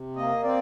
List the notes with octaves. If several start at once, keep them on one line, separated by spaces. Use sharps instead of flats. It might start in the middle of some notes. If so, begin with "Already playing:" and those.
Already playing: C3
A#3 D#5
C4 D5